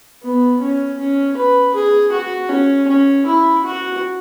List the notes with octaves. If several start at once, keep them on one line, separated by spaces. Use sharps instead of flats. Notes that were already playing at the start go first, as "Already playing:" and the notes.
B3
C#4
C#4
B4
G#4
F#4
C#4
C#4
E4
F#4